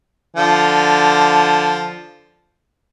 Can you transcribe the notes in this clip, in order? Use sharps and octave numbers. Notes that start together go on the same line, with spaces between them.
D3 F3